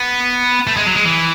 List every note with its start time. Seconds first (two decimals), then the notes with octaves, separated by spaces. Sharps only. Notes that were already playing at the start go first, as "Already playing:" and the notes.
Already playing: B3
0.67 A3
0.77 G#3
0.86 F#3
0.95 G#3
1.05 E3